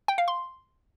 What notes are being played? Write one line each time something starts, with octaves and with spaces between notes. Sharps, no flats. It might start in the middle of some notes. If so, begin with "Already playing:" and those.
G5
F5
C6